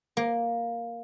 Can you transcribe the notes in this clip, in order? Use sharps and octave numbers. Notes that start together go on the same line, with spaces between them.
A#3